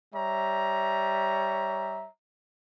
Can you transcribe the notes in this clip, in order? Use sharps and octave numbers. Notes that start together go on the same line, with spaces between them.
G3 C#5 E5 A#5